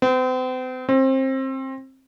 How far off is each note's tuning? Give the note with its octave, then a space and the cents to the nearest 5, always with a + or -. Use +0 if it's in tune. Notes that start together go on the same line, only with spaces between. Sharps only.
C4 -40
C4 +25